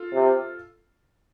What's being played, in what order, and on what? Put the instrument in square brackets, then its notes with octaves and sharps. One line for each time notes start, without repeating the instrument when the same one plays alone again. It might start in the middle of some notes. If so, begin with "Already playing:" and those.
Already playing: [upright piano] F4 A4
[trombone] C3